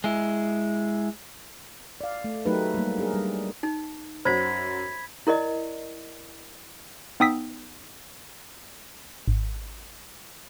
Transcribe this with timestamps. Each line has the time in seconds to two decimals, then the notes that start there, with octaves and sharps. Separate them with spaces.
0.04 G#3 E4
2.01 D5 F5
2.24 A3
2.45 F#3 A3 D#4 G4 A#4 B4
2.74 G3 A#3
2.98 D4 G#4 A#4
3.14 G3
3.63 D#4
4.25 F#2 F#4 C5 B5 G#6 B6
5.27 E4 A#4 D5 D#5
7.20 B3 D#4 G5 D#6 E6 B6
9.28 G#1